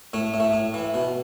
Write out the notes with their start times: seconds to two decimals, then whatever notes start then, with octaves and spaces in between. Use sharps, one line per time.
0.13 A2 A3
0.34 A2
0.40 A3
0.54 A2
0.74 E3
0.94 B2